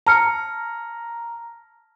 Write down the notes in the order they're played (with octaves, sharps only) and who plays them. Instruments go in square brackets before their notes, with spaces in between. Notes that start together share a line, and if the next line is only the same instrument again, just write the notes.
[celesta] A5 F6 C#7 [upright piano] A#5